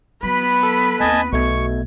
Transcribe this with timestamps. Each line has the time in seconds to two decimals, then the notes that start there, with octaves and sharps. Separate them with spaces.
0.23 F#3 B3 B4 B5
0.63 A4
1.00 D#2 C4 D#5 G#5 A5
1.33 B1 B2 A3 C#6 G#6